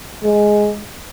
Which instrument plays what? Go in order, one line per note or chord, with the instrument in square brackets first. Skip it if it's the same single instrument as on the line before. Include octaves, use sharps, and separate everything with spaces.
[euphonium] G#3